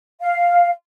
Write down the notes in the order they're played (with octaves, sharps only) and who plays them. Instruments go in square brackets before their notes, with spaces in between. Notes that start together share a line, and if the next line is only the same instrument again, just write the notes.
[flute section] F5